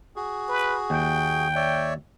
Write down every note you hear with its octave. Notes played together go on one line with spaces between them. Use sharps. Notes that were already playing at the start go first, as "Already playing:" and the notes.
F#4 G#4
B4
D#2 G5
C#5 D5 E5